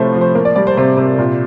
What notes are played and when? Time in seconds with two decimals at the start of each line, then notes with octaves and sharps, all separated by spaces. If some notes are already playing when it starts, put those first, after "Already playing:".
Already playing: A2 C3 F3 A3 C5
0.14 F3
0.21 C5
0.35 A#3
0.45 D5
0.56 G3 D5
0.67 C5
0.77 C3 C5
0.97 C3
1.19 A#2